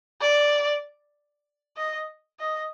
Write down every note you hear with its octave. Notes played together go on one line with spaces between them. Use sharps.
D5
D#5
D#5